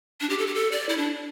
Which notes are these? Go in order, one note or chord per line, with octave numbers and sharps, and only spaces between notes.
D4
G4
A4
G4
A4
D5
E4
D4